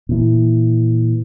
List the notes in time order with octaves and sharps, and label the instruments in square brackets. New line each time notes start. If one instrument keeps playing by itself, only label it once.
[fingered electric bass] A#2 E3